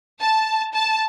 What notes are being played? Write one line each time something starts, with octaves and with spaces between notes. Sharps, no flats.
A5
A5